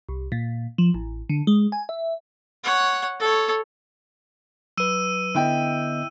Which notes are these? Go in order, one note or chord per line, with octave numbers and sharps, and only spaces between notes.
C2
A#2
F3
A1
D3
G#3
G#5
E5
C#5 F#5
A4 C#5
F#3 B4 E6 D#7
D3 B3 E4 D#5 G5